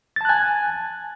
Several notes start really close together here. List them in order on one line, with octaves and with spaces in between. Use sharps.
A6 A5 F#6 G#5